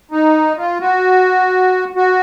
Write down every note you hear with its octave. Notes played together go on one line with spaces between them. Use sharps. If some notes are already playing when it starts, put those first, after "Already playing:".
D#4
F4
F#4
F#4